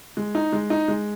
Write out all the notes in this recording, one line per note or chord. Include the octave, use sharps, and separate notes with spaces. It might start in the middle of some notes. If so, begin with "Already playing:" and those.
G#3
D#4
G#3
D#4
G#3